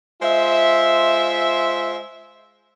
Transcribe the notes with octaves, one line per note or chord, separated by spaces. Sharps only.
G#3 F4 C5 E5